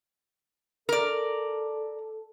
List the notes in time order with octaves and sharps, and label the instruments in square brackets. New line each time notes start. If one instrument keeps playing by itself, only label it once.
[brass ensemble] A4 [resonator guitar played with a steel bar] A#4 D5